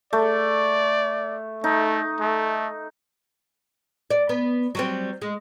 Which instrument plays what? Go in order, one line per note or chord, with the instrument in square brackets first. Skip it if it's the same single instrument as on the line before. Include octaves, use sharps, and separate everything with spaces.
[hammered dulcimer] A3 [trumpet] D5
[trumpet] A3 [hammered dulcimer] D#4
[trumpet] A3
[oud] D5
B3
F#3 G3 C4
G#3